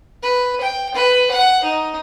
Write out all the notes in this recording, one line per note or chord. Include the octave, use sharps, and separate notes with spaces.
B4
G5
B4
F#5
D#4